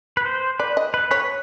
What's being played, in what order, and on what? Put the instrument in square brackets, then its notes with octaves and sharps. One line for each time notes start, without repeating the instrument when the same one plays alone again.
[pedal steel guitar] B4
C5
[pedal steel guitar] B4 [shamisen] D5
[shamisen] D#5
[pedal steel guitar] B4
[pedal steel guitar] B4 [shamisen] C#5